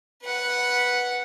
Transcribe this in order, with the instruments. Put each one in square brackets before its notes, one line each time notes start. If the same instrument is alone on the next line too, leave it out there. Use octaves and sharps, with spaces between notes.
[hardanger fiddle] B4 F#5